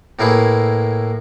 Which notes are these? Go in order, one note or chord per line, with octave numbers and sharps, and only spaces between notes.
A2 A#3 E4 G#4 B4